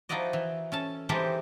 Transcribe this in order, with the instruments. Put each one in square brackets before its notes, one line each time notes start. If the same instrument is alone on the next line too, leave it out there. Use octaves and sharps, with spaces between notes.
[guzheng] F3 D#4 E4 F#4 D5 D#5
E3
C#4 A4 A5
E3 G#3 D#4 G4 A4 C5